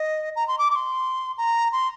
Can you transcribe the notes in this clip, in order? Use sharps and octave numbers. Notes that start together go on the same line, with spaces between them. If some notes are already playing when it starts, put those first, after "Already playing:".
Already playing: D#5
A#5
C6
D6
D6
C6
A#5
C6